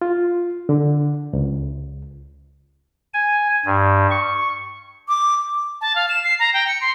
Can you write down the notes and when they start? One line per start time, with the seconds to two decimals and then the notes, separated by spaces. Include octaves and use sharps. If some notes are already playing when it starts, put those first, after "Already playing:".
0.02 F4
0.69 D3
1.33 C#2
3.14 G#5
3.66 G2
4.11 C#6
5.08 D6
5.81 A5
5.96 F5
6.09 E7
6.24 C7
6.39 A#5
6.54 G5
6.68 C#7
6.81 C6